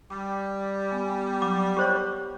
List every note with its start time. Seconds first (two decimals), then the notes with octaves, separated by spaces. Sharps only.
0.10 G3 D6
0.91 B3 G#5
1.42 F#3 D6 G6
1.77 G4 C5 C#5 B5